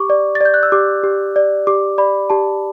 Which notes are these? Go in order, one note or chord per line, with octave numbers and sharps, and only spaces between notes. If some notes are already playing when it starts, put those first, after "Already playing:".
Already playing: G4 C#6 D6
D5
A6
D5 G6
F#6
E6
G4 D6
G4
D5
G4 D6
D5 B5
G4 A5